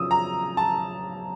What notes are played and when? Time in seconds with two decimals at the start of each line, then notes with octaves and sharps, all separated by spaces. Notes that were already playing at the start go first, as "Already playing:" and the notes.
Already playing: F#2 C#3 F3 D#6 E6
0.11 A#5
0.57 A5